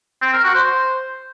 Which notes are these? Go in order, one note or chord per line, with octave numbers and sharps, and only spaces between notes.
C4
A#4
F#4
C5